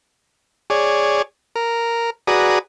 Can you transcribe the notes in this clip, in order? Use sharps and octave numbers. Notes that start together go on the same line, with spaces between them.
G#4 C#5 D5
A#4
F#4 G#4 B4 D5 A#5 D#6